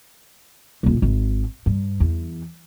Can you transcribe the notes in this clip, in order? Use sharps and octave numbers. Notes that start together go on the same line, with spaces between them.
D#1 A#1
G#1
G2
E2